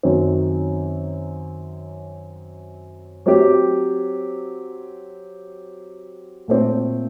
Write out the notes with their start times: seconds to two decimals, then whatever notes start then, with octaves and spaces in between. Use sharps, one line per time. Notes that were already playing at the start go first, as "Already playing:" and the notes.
0.03 F#2 D#3 F#3 C4
3.26 F#3 C4 G4
6.48 A#2 A3 C4